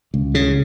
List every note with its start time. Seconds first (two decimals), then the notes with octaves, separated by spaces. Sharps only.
0.14 C#2
0.35 C#3